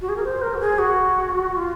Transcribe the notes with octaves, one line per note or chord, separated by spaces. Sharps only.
F#4
G#4
A#4
C5
A#4
F#4
G#4
F#4
F4